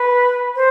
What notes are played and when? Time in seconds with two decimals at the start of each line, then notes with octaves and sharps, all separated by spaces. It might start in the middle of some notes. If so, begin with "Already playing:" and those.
Already playing: B4
0.55 C5